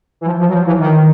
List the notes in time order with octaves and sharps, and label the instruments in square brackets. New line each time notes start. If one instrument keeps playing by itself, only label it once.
[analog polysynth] E3
F3
F3
F#3
F3
E3
D#3